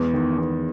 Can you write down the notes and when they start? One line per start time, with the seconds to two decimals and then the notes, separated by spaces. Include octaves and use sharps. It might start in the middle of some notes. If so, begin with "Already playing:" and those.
Already playing: E2 G#3
0.13 D#3
0.38 E2